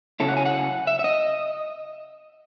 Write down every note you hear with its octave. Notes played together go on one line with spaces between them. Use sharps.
C#3 F#3 C#4 E4 A4
F#5
G#5
F#5
E5
E5
D#5